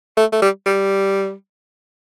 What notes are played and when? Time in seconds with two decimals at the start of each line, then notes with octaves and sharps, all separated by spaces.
0.17 A3
0.32 A3
0.42 G3
0.66 G3